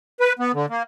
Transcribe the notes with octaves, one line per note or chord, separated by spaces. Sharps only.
B4
B3
D3
A#3